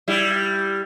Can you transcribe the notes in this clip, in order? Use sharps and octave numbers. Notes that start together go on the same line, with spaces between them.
G3 E4